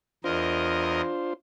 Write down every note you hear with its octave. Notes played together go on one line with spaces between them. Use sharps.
E2 D4 F4 A#4 C5 D#5